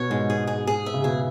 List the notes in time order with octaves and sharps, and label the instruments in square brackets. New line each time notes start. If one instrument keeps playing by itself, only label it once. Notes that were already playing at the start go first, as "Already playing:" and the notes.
Already playing: [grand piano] B2 [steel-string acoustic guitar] C#5
[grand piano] G#2 [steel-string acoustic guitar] G#3
[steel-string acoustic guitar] G#4
G#4
G#4
E5
[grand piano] C#3
[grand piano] B2 [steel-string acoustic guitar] G#4